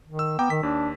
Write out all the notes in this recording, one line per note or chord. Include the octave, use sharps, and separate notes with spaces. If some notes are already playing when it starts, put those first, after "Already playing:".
D#3
E6
B3 G5 A#5 D6
D#3 B6
D#2 D4